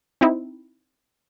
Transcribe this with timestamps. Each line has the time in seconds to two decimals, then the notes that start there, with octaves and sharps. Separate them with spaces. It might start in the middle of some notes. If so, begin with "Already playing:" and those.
0.21 C4 D#4 E4